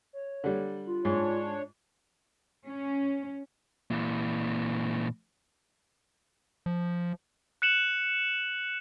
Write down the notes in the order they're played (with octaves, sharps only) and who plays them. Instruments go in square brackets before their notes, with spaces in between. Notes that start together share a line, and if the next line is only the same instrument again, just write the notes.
[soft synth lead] C#5
[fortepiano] D3 G3
[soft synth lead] F4
[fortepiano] G#2 [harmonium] D4 C#5
[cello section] C#4
[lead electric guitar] A#2 E3
[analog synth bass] F3
[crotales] F#6 C#7 E7 F#7